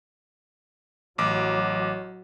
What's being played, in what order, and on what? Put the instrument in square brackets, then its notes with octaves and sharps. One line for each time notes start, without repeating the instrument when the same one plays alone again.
[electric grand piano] A1 D6 [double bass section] F#3